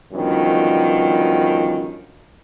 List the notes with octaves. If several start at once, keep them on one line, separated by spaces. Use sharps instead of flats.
F#2 B2 D3 D#3 F3 G3